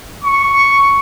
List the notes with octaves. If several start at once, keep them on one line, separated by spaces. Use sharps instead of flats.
C#6